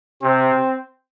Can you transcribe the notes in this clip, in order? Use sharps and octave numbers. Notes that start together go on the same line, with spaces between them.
C3 C4